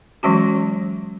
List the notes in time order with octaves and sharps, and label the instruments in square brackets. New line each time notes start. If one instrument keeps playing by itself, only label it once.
[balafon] E3 F#3 G#3 C#4 F#4